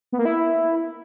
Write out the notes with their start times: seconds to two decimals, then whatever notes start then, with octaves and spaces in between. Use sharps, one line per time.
0.12 B3
0.19 A#3
0.25 E4